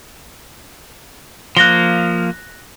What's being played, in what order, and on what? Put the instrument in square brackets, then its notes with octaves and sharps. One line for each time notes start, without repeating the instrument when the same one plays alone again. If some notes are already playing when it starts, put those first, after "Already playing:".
[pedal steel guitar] F3 A#3 [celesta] F#6 A#6 G7